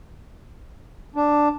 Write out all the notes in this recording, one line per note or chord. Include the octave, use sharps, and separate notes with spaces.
D4